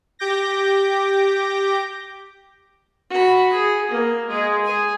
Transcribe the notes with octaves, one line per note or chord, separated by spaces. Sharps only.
G4 D6 G6 A#6
F#4 B5
G#4
A#3
G#3 G#4
G#4 G#5